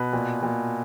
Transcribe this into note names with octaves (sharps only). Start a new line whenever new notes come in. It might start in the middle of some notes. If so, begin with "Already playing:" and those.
Already playing: B2 B4
A#2
A#2